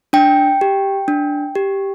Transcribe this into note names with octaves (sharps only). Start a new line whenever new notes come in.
D4 G5
G4
D4
G4